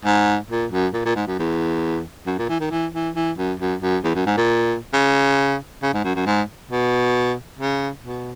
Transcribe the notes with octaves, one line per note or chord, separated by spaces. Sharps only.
G#2
A#2
F#2
A#2
A#2
G#2
F#2
E2
F#2
A#2
E3
D#3
E3
E3
E3
F#2
F#2
F#2
E2
F#2
G#2
A#2
C#3
C#3
G#2
F#2
F#2
G#2
B2
C#3
B2